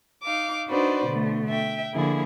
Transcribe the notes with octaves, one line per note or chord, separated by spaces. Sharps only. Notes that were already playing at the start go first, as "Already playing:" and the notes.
D#4 F5 D6
D4 D#4 F#4 B4 C5 D5
B2 D3 A3
E5 G5
D3 F3 A#3 E4 G#4